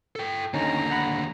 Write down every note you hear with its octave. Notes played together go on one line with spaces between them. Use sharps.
A4 G5
D#2 D3 C#4 D#4 A#5
F#5 B5